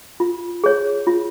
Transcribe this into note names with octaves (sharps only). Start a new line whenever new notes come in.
F4
G#4 C#5
F4